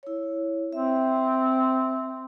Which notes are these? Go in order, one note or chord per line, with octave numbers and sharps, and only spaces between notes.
E4 C#5
C4 E5